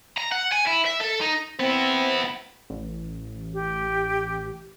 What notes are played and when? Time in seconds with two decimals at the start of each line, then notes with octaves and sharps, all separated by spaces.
0.18 A#5
0.32 F#5
0.52 G#5
0.67 E4
0.86 E5
1.01 A4
1.21 D#4
1.60 B3 C4 E4
2.70 A1
3.53 G4